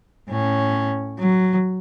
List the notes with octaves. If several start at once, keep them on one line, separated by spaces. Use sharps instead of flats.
A2 C#4
F#3